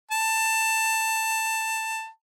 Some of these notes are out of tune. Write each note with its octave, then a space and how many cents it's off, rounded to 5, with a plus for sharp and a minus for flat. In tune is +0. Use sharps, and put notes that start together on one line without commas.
A5 +15